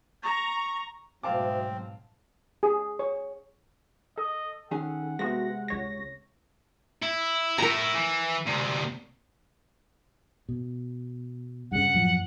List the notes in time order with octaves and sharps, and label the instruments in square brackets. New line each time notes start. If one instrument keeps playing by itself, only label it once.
[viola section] A#5 [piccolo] C#6
[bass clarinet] D2 [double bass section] G#2 B2 F#3 [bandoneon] C4 [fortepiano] F5 A5 D6
[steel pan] G#4
C#5
[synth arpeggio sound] A4 [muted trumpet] D#5
[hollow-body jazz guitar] D#3 C#4 G#4 [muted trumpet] F#5
[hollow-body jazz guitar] C3 G#3 A3 [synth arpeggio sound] B3 F#4 A#6
[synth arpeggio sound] C#2 C#5 A#6
[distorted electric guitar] E4
[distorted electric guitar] A3 E4 [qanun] A#4 A#5
[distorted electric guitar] E3
D2 C3
[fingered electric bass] B2
[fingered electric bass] G2 C#3 [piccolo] F#5
[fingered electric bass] F#2 A2 F3